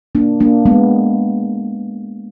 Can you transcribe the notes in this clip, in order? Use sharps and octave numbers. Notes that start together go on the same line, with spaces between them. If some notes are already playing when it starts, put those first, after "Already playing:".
A#3 D4
A#3 D4
G#3 B3